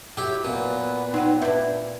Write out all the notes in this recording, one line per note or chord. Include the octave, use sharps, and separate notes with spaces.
F#3 E4 G4
A#2 B3
F#3 C4 D#4 F#5
D4 E4 B4 E5